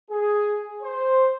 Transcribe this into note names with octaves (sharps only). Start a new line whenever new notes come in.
G#4
C5